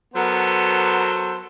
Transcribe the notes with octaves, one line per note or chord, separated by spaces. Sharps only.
F#3 B3 A4 A#4 C5